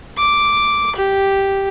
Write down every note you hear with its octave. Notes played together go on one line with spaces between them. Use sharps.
D6
G4